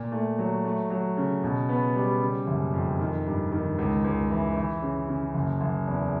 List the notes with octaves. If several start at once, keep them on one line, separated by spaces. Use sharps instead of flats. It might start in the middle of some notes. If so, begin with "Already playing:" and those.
Already playing: A#2
A3
F#3
A3
F#3
C#3
B2
B3
G3
C#3
F#1
F2
D#3
G2
D#3
C#2
C#2
E3
E3
C#3
C#3
F#1
F#1
E2